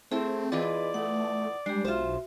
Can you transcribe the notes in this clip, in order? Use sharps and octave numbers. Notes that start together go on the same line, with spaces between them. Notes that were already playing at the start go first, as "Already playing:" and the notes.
A3 C4 E4 G#4 C5
E2 E3 F4 G#4 B4 D5 D#5
A3 F#5 D#6
G3 G#3 D4 G4
B1 F4 F#4 C5 E5